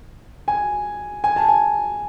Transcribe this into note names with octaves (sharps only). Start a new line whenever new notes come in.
G#5
G#5
A5
G#5